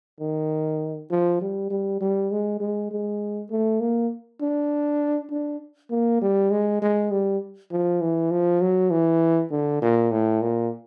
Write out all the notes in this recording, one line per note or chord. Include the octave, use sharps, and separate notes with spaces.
D#3
F3
G3
G3
G3
G#3
G#3
G#3
A3
A#3
D4
D4
A#3
G3
G#3
G#3
G3
F3
E3
F3
F#3
E3
D3
A#2
A2
A#2